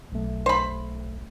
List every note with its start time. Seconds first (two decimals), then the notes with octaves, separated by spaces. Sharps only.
0.12 B1 A3
0.46 C5 B5